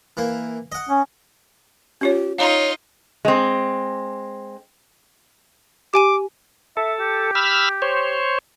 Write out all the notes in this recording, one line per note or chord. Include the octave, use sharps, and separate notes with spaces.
E3 A#3
D#5 F#5
C#4
C#4 F4 G4 C#5
D#4 F4 C#5 F5 A#5
G#3 C4
G4 G#5 D6 D#7
A4 E5
G4
B5 E6 F6
C5 C#5